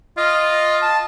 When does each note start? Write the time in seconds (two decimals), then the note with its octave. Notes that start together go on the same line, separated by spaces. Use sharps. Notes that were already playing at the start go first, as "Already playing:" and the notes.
0.17 F4 D#5
0.82 A5